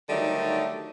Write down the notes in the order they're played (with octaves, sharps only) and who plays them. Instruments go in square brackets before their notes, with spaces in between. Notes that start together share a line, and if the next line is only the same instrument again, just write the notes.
[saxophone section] D3 D#3 F#3 G3 A3 D#4